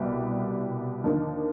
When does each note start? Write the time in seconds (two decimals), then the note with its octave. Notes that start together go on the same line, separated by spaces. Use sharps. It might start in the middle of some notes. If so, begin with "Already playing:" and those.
Already playing: C2 B2 G3
1.04 D#2 D3 F3 A#3 D#4